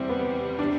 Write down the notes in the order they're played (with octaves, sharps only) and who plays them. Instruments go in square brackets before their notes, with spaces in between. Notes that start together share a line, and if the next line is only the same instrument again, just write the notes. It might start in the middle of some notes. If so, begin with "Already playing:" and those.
Already playing: [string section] E2 C3 G3 [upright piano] C4 E4
[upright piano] B3
D4